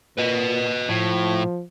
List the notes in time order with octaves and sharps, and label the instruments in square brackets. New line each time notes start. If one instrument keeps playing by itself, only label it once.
[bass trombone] A#2 [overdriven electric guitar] B4 D#5
[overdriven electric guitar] A2 [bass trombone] F3